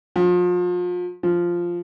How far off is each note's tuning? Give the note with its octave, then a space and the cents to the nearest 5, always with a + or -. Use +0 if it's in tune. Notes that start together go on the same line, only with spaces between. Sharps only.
F3 +35
F3 -5